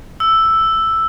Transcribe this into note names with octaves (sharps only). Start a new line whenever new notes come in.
E6